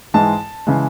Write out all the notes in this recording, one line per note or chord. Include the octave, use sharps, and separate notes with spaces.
G#2 E3 G#3 A5
C#3 E3 G#3